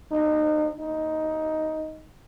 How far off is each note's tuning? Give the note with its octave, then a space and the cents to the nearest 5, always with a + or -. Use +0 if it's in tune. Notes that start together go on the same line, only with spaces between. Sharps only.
D#4 -30
D#4 +10